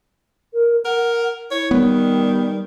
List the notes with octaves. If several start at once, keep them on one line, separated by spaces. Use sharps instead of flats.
A#4
A#4 F#5
E4 C#5
D#3 G3 B3